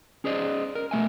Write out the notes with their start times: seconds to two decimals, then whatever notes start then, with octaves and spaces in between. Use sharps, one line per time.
0.24 C#4 G#4 C5 D5 D#5
0.75 A#4
0.91 B2 A3 E5 G#5